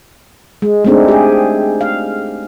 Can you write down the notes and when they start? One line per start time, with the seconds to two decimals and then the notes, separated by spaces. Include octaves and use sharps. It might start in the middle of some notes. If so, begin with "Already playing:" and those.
0.62 G#3
0.85 G#3 A3 C4 D4 D#4
1.08 G4 G#4
1.81 F5